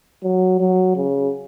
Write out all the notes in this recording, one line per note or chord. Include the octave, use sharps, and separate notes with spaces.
F#3
F#3
C#3